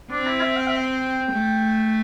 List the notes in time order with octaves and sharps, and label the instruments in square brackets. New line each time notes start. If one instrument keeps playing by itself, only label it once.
[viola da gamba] C4 [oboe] D4
[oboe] E4
E5
G5
E5
G5
[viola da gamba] A3